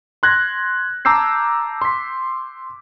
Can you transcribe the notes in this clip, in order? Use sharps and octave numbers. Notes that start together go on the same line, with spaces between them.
C6 F#6 G#6 A#6
A5 A#5 D6 E6 G6 C7
C6 B6